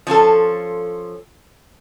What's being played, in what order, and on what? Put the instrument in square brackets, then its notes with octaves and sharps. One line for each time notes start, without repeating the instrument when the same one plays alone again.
[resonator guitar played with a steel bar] F3 C#4 F4 A4